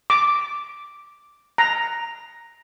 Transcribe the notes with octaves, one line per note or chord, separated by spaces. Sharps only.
D6
A#5